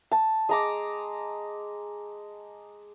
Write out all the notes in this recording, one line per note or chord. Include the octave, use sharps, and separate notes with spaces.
A5
G#3 A#5 D6